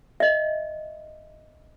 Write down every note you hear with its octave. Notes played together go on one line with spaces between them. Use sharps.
D#5 E5